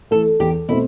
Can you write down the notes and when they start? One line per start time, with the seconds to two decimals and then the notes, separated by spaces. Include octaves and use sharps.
0.11 E3 A3 A4
0.40 E2 G4
0.69 B2 A3 C4 E4